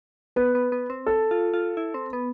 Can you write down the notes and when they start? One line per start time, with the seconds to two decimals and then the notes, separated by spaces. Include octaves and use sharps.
0.36 B3 B4
0.55 B3
0.72 B3
0.90 C4
1.06 A4
1.31 F4
1.54 F4
1.77 E4
1.94 C4
2.13 B3